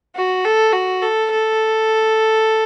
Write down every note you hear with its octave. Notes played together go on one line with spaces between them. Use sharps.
F#4
A4
F#4
A4
A4